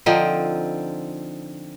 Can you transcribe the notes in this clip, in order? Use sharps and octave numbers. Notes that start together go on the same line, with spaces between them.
D3 F3 C4 D#4